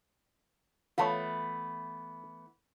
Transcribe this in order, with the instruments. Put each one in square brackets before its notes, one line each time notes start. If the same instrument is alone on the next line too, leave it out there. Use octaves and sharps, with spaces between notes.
[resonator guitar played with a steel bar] E3 A3 B3 [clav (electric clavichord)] F4 A4 C#5